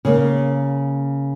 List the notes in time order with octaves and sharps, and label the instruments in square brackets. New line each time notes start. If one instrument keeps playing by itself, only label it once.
[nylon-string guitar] C#3 A#3